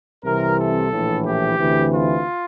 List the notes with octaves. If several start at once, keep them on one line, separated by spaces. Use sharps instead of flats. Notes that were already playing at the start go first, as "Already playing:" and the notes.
C2 C3 E3 A#4
A4
A#1 A2 E3
G4
D2 C3 E3
F4